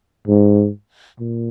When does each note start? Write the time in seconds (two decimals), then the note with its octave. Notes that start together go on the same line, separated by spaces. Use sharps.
0.28 G#2
1.20 A#2